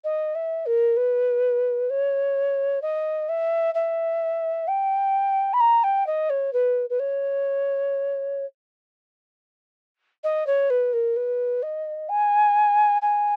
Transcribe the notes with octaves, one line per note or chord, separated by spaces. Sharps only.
D#5
E5
A#4
B4
C#5
D#5
E5
E5
G5
B5
A#5
G5
D#5
C#5
B4
B4
C#5
D#5
C#5
B4
A#4
B4
D#5
G#5
G#5